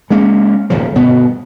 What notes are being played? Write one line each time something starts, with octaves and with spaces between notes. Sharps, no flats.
G#3 A#3 C#4
D#1 G#1 C#3 F3
G1 B2 B3